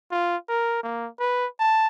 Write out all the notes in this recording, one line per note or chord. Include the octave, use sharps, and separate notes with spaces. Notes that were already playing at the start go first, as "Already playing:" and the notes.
F4
A#4
A#3
B4
A5